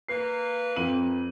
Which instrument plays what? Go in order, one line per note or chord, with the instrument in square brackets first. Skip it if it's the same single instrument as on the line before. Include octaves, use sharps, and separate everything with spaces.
[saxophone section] A#3 B4 [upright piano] C7
[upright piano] F2 D#7 F#7